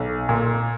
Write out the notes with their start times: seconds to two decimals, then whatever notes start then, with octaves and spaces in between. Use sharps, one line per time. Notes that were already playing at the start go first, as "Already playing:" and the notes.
Already playing: B1
0.29 A#2